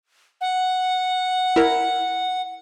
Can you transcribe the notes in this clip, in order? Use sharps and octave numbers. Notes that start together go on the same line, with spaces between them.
F#5
E4 A#4